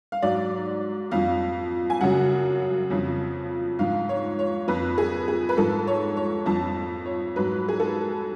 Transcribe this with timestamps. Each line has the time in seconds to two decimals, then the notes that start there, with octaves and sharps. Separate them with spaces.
0.12 F5
0.22 G#2 F#3 D5
1.11 F2 F3 F5
1.90 G#5
2.01 F#2 C#3 F#3 F#5
2.90 F2 C#3 F3
3.79 G#2 F3 F5
4.09 C#5
4.39 C#5
4.68 F2 F3 B4
4.98 G#4
5.28 G#4
5.49 B4
5.57 G#2 F3 A4
5.87 C#5
6.17 C#5
6.46 F2 F3 A5
7.06 C#5
7.36 G#2 F#3 B4
7.68 G#4
7.80 A4